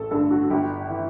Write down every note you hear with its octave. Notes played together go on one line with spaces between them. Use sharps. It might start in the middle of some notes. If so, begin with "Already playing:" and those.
Already playing: A1 A4
G2 D3 A4
F#4
G1 G4
E3